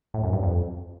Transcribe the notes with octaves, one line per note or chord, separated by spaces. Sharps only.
A2
F#2
G2
F2